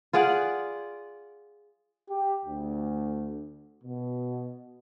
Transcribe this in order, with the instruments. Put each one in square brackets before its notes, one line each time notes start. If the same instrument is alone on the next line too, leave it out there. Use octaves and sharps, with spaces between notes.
[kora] F4 G#4 D5 F#5
[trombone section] G4
D2
B2